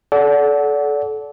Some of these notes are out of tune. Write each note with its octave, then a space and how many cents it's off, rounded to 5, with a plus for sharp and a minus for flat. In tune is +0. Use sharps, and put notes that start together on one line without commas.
A4 -25 D5 -30 F#5 +0